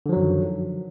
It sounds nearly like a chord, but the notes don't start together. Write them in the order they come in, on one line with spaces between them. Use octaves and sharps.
D3 F3 F#3 F#2 D#3